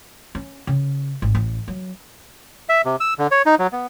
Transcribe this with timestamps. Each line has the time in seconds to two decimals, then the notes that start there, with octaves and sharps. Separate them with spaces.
0.35 C#4
0.67 C#3
1.22 G#1
1.35 A1
1.68 F#3
2.69 E5
2.85 C3
3.00 E6
3.18 D3
3.31 C#5
3.46 D#4
3.59 F#3
3.72 B3